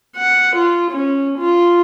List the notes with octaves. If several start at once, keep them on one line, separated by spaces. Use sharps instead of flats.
F#5
F4
C#4
F4